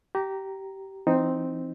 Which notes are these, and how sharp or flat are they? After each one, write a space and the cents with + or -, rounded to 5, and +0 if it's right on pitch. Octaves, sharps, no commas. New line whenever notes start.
G4 -20 A#5 +0
E3 +30 C4 +0 D#4 +0